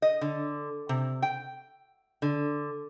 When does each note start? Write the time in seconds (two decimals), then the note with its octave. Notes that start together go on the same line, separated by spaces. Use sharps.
0.02 D#5
0.21 D3
0.89 C3
1.22 G5
2.22 D3